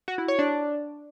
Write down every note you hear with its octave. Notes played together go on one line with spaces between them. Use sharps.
F#4
E4
C#5
D4